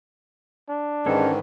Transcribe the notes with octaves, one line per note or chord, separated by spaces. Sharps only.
D4
G#2 D#3 E3 G#3 C#4 A4